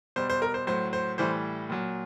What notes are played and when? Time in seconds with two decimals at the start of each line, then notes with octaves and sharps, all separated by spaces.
0.16 B2 G3 C5
0.30 C5
0.42 A#4
0.54 C5
0.67 A2 F#3 C5
0.93 C5
1.18 A2 E3 G3 C5
1.70 A#2 F#3